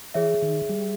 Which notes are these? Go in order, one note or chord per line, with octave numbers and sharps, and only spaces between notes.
E3 G#4 C#5 E5
D#3
G3